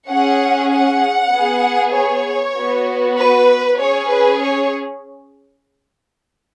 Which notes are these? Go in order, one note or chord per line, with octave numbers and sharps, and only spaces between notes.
C#4 G#4 F#5
F#5
B3 G#4
C#5
B3 F#4
B4
C#4 G#4 C#5
B4
C#5